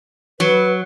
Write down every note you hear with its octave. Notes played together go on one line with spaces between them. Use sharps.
F#3 B4